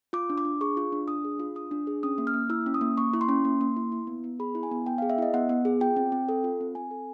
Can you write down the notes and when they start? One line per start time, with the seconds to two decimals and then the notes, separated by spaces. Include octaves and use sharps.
0.13 F4 D6
0.30 D4
0.38 D6
0.45 D4
0.61 G#4 C#6
0.77 F4
0.92 D4
1.08 D4 D#6
1.25 G#4
1.40 F4
1.55 D4 D#6
1.71 D4
1.87 G#4
2.03 C#4 D#6
2.18 A#3
2.27 F6
2.34 A#3
2.50 E4 E6
2.66 C#4
2.74 D#6
2.81 A#3
2.97 A#3 C#6
3.14 E4
3.21 C6
3.29 C#4
3.45 A#3
3.61 A#3
3.76 E4
3.92 E4
4.07 B3
4.24 B3
4.40 G#4 B5
4.55 E4
4.63 G#5
4.71 B3
4.86 B3 G5
4.98 F5
5.02 G#4
5.10 E5
5.18 E4 D#5
5.34 B3 F#5
5.49 B3
5.65 G#4
5.81 F4 G5
5.96 C4
6.12 C4
6.29 A4
6.44 F4
6.61 C4
6.75 C4 G#5
6.91 A4